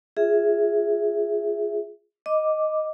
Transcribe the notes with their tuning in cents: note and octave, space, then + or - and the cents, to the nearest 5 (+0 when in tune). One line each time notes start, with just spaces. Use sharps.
F4 +0 G#4 +0 E5 +0
D#5 +0 D6 +0